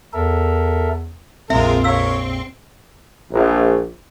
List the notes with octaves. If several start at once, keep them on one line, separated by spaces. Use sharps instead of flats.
E2 A4 A#4 E5
A#1 F2 G#3 C4 F4 A#4 E5
A#4 C#5 F5 E6
A#1